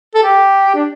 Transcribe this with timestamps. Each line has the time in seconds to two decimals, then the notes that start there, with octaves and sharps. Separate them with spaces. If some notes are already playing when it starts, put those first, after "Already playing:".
0.14 A4
0.23 G4
0.74 D4